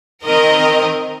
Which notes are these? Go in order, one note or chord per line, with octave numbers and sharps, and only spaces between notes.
D#3 C4 A#4 D#5